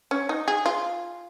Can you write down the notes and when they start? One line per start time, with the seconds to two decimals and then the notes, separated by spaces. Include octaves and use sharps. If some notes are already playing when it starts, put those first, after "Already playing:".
0.11 C#4
0.29 D#4
0.48 G#4
0.66 F4